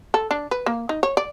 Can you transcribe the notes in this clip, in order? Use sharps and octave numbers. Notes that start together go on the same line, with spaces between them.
A4
D4
B4
A#3
D#4
C#5
D5